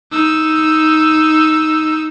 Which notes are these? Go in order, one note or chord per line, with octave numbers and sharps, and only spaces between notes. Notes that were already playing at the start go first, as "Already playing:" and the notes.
D#4 E6